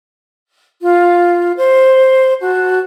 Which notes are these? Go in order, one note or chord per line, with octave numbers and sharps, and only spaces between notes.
F4
C5
F#4 A5